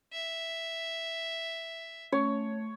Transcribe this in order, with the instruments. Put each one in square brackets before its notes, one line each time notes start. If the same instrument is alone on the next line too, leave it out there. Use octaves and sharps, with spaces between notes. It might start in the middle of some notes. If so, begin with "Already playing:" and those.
[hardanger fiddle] E5
[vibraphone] A3 [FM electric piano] C#4 [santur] C#5